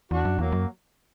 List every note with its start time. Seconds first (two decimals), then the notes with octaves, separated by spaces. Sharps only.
0.11 E2 D4 F#4
0.25 F#2
0.39 E2 F#3 A#3
0.52 F#2